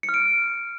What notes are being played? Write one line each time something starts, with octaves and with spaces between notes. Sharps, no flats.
C#7
F6
D7